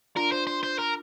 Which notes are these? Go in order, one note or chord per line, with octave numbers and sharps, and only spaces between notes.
D4 F4 A#4
C5
C5
C5
A#4